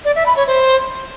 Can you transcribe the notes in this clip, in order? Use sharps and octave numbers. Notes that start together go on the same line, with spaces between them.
D5
E5
B5
C#5
C5